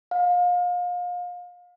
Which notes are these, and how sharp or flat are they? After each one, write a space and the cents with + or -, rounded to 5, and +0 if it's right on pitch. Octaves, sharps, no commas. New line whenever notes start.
F5 +35